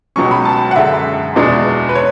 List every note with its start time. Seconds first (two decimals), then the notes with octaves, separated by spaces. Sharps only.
0.16 C#2 B2 F#3 C#4 C#6
0.31 B5
0.45 A5
0.71 F#5
0.76 F#2 D3 G#3 E5
1.36 E2 B2 G#3 D4
1.89 B4
1.95 C#5